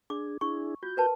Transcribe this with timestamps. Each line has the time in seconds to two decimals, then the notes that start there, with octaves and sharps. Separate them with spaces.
0.10 D4 G#4 D6
0.41 D4 E4 G#4 C#6
0.83 F4 F#4 G6
0.97 A#4 B4 A5